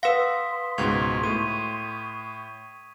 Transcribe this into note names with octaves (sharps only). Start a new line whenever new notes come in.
B4 F5 F#5 C6 D#6 E6 B6
C#2 G#2 B2 C#6 G#6 F7
A2 D#7